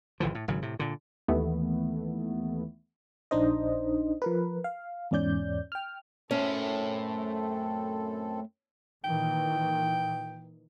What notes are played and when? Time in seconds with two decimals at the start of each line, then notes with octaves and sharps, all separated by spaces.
0.20 G#1 D3 E3 F3
0.35 A2
0.48 G#1 C#3 F#3
0.62 A2 C3
0.79 A#2 D3
1.28 D#2 E3 A3 B3
3.31 A#1 D4 D#4 C5 D#5
4.22 F3 A#4 B4
4.64 F5
5.11 E2 G#2 C#4 D5 G6
5.72 G5 F6
6.31 F#2 A3 C4 C#4 A4 C#5 E5
9.04 A#2 D#3 E3 G5